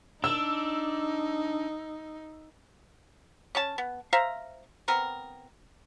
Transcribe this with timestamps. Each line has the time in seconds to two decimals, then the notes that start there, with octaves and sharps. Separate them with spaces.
0.24 D4 D#4 E6
3.55 C#4 C#5 A5
3.78 B3
4.13 C5 E5 F5 A#5
4.88 B3 C4 A#4